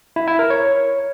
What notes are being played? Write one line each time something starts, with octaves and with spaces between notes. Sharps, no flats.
E4
E4
A#4
C#5